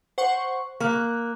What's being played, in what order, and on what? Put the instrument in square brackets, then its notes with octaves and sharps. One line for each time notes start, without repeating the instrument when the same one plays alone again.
[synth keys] C5 F#5 C#6
[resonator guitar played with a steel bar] A#3 [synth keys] F#6